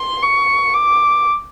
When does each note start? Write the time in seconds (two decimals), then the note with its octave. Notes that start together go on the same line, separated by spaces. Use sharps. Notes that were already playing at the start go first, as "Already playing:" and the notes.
Already playing: C6
0.23 C#6
0.74 D6